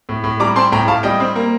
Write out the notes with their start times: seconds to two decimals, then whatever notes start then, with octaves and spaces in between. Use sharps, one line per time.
0.09 A2
0.24 A2
0.40 G3 A#5 D6
0.56 C4 A5 C6
0.72 A2 G5 A#5
0.88 A2 F5 A5
1.03 G3 D#5 G5
1.20 C4
1.36 A#3